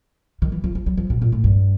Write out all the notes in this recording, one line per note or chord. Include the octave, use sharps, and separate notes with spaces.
D#3
E3
F3
F3
F#3
F3
B2
A#2
A2
G2